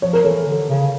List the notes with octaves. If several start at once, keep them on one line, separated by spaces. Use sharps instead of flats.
F3 C#5
A#4
E3 A4 C#5
D3
C#3